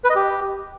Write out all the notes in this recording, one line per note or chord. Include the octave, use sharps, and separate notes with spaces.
B4
D#5
G4